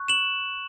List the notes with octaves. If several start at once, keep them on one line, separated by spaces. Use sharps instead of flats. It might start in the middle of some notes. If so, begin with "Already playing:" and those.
Already playing: C#6 F#6
E7 F#7